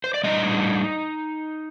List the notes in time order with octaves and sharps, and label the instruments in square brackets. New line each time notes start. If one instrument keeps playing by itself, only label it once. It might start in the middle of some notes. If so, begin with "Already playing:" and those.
[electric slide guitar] C5
D5
A2 G3 D4 D#4 D#5